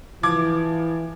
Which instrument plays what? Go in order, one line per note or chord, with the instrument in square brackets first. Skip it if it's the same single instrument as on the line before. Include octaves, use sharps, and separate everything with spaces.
[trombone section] E3 [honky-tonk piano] F3 D6 G#6